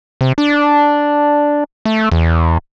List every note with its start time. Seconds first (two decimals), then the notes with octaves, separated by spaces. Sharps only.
0.21 C3
0.38 D4
1.85 A3
2.12 E2